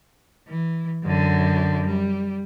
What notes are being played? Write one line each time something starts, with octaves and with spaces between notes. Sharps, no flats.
E3
F#2 D3
G3